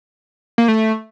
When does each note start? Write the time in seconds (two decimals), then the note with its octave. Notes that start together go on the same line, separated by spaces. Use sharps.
0.58 A#3
0.68 A3